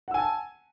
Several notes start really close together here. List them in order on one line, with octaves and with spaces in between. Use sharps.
F#5 E6 G#5 A5